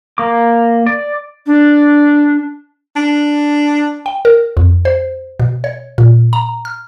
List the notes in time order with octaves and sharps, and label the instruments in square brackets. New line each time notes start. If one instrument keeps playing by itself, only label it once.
[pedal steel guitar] A#3 D6
D5
[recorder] D4
[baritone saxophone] D4
[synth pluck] G5
A#4
F2
C5
B2
C#5
A#2
A#5
F6